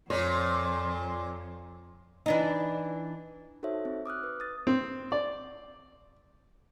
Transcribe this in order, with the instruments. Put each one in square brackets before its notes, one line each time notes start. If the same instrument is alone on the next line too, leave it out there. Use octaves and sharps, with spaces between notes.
[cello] F2 [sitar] A#2 [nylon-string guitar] C#5 [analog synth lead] C6
[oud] E3 D4 D#4
[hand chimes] D#4 F#4 A4 C5 C#5 E5
C4
D6 D#6 F6 F#6
B4
D#6 A6
[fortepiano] C4
D5